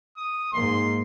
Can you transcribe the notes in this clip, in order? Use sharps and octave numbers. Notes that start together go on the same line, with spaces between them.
D#6
G#2 A#3 C6